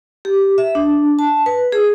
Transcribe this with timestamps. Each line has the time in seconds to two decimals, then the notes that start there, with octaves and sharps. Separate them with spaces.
0.25 G4
0.58 E5
0.75 D4
1.19 A5
1.46 B4
1.72 G#4